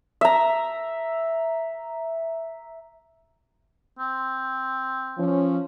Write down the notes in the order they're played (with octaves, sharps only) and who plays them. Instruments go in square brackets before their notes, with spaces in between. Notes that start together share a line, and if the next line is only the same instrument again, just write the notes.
[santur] E5 A#5
[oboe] C4
[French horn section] F3 C#4